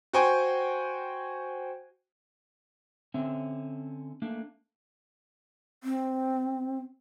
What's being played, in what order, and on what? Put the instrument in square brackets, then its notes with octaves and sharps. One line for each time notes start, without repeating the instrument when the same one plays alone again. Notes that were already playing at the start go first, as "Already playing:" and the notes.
[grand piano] F#4 C5 G5 G#5 C#6
[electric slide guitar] D3 C4 C#4 E5
A3 A#3 D4
[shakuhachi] C4